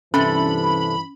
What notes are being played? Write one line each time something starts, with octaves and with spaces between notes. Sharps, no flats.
G2 C3 E3 C#4 A4 B5